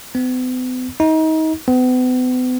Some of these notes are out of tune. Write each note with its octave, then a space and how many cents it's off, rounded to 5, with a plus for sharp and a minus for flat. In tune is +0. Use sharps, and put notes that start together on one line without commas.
B3 +45
D#4 +30
B3 +40